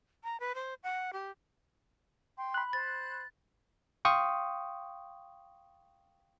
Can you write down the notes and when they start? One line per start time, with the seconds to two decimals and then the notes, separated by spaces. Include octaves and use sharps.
0.24 A#5
0.40 B4
0.55 C5
0.83 F#5
1.13 G4
2.38 G5 C6
2.54 B5 F#6
2.73 C5 A6
4.05 F5 G5 C6 C#6 D#6